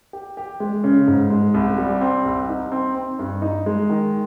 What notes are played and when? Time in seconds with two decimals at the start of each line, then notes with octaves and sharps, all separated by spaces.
0.13 G4
0.37 G4
0.60 G#3
0.84 C#3
1.07 G#2
1.30 G#3
1.54 C2
1.78 G3
2.01 C4
2.25 C2
2.49 D#4
2.72 C4
2.95 C4
3.19 G2
3.42 D#4
3.66 G#3
3.90 D#3